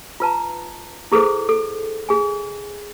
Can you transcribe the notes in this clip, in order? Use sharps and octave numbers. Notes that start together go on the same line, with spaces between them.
F4 B4 A5 A#5
E4 G#4 A4 B4 C5 D6
A4
G#4 G#5